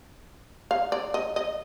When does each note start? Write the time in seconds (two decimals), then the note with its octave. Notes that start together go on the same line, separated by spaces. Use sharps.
0.71 F5
0.92 D5
1.14 D#5
1.36 D#5